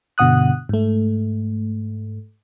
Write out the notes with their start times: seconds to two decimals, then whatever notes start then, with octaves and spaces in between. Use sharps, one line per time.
0.18 G2 B2 D3 F#5 D#6 F#6
0.69 G#2 A3